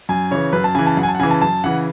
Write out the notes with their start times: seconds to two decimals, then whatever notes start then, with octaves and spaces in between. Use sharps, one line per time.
0.09 F#2 G#5
0.31 C#3 E3 C#5
0.53 F#2 B4
0.64 A5
0.75 C#3 E3 G#5
0.86 A5
0.97 F#2 F#5
1.03 G#5
1.09 A5
1.15 F#5
1.19 C#3 E3 G#5
1.31 A5
1.41 F#2 A5
1.64 C#3 E3 F#5